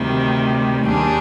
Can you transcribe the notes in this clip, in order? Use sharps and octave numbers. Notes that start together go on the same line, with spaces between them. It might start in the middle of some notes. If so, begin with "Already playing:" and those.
Already playing: D2 C3 D#3 G3
D#2 D#3 G3 D4 G#4